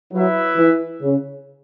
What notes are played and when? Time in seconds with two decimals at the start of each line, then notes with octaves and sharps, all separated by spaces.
0.12 F#3 E4 B4 E5
0.57 E3
1.02 C#3